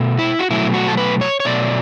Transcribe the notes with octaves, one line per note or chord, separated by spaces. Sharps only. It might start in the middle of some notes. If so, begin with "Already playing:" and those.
Already playing: B2 A3
E4
F#4
B2 F#3 A3 E4
F#4
A4
B4
C#5
C#5
B2 F#3 A3 D5